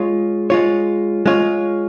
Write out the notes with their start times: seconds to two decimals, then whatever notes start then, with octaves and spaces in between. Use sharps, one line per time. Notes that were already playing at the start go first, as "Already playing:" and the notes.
Already playing: G#3 F4 C#5
0.50 G#3 F4 C#5
1.26 G#3 F4 C#5